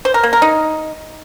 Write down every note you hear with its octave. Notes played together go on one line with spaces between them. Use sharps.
C5
A#4
A#3
A#4
D#4